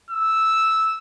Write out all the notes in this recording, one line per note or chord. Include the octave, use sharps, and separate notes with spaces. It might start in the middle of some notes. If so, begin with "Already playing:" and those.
E6